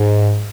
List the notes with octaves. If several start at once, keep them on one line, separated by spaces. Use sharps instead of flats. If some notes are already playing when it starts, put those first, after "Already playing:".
Already playing: G#2